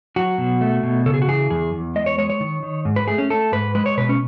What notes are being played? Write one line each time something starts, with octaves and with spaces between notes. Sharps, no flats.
F#3 F#4
B2
A3
B2
C#3 A4
G#4
F#4
E3 G#4
E2 G#4
E2
G#3 D#5
C#5
G#3 C#5
C#5
D#3
D#3
G#2
B4
A3 G#4
C#4
A3 A4
G#2 B4
G#3 B4
C#5
B2 B4
C#4